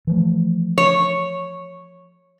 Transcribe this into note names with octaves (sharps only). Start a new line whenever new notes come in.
E3 F3 A3
C#5